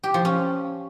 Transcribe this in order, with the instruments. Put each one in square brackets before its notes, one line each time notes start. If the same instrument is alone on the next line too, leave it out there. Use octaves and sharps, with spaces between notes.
[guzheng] G4
F3
C#4